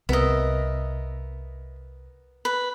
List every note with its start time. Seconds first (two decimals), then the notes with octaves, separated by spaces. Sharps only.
0.09 C2 B3 A#4 D#5 E5
2.45 B4